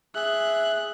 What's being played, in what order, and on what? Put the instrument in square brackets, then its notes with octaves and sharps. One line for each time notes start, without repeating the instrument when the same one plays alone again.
[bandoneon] G#4 E5 [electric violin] F#6